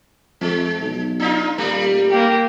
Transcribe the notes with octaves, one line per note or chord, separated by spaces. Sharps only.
F2 G#3
B1
D4 D#4 F4
D#1 G3 A3
A#3 G4